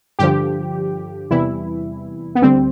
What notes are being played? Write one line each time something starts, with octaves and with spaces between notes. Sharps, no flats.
G2 D3 F3 G4
E2 C3 E3 G3 E4
B3
D2 D3 G3 C4